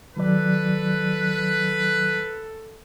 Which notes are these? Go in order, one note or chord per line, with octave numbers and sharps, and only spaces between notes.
D#3 F#3 A4 B4 D5